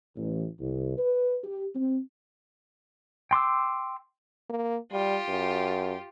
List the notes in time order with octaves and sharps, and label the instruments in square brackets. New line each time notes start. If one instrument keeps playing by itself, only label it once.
[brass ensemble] A1
C2
B4
G4
C4
[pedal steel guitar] G5 C6 D6 E6
[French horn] A#3
[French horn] G3 [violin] F4 G4
[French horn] F#2